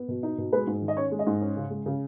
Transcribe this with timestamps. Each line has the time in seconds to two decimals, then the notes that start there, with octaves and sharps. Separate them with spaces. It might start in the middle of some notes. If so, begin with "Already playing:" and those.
Already playing: B3
0.08 B2
0.23 D#4
0.38 B2
0.53 G#3 B4
0.67 G#2
0.82 D#3
0.88 D#5
0.96 C#4 C#5
1.11 G#3
1.19 D#5
1.27 G#2
1.41 C#4
1.57 C#3
1.70 G#3
1.86 C#3